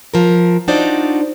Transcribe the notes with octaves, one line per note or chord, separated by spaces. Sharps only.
F3 A#4
D4 D#4 F4 F#4 C5 D5